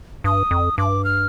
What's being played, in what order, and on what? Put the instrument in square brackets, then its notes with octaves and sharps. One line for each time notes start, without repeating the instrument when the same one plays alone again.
[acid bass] G2 [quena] D#6
[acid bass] F2
[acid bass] G2 [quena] D6
[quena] F6